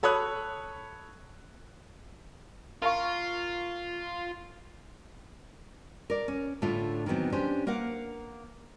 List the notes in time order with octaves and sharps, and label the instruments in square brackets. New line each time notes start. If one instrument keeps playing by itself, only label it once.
[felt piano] A4 C#5 B5 D#6 F#6
[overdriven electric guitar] F4 [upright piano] A#4 F5 C#6
[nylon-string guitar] A#4 D5
C#4
A2 D3 A3 D4 F4
D#3 E3 F#3 B3 C4
C#4 D4 G4 C5
A#3 A#4 F5 F#5